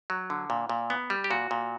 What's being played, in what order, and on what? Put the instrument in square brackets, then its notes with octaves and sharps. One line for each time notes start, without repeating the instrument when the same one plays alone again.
[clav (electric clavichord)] F#3
D3
A#2
A#2
B3
G3
G4
A#2 F#4
A#2